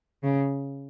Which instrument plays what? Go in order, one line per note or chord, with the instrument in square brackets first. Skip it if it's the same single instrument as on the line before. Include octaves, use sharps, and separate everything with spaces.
[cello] C#3